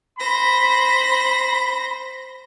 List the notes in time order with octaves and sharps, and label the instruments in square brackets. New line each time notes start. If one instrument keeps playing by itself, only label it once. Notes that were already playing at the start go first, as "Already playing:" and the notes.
[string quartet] C5 A#6 [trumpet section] B5